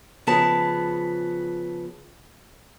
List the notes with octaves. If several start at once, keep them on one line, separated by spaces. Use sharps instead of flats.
C#3 F3 B3 G#4 B4 A5